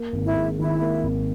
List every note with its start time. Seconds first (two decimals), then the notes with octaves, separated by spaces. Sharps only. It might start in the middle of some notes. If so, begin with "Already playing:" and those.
Already playing: A#3
0.13 G#1
0.25 E4
0.36 G#2
0.58 D#3 E4
0.81 A#3
1.03 G#1